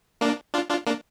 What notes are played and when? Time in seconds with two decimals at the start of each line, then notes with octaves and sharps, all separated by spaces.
0.21 A#3 D4
0.54 D4 F4
0.70 D4 F4
0.87 A#3 D4